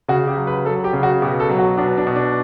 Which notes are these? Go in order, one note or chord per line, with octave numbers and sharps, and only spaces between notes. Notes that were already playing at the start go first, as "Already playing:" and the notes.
C#3 F#4
G4
F#3
B4
F#3 A4
G4
C#3
F#4
B2 G4
A4
F#3
F#4
B2 D4
D4
B2
D4